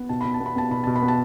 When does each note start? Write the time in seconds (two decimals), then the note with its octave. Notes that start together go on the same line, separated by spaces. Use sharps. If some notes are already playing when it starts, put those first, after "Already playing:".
Already playing: B3
0.09 B2 A5
0.21 B2 B5
0.34 A5
0.40 B3
0.46 B5
0.56 B3 A5
0.71 B2 B5
0.84 B2 A5
0.96 B5
1.02 B3
1.08 A5